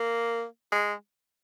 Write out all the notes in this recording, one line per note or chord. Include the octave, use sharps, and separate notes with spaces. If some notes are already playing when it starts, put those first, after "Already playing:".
Already playing: A#3
G#3